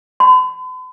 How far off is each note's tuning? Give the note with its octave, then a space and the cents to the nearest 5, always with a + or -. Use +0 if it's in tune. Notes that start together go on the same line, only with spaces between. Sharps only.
B5 +45